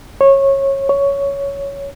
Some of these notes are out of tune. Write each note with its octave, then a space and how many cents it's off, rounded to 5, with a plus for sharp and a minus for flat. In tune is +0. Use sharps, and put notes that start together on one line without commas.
C#5 -20
C#5 +10